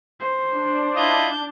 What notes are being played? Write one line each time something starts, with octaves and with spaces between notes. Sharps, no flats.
C5
D4
E4 F4 D#5 A5 G6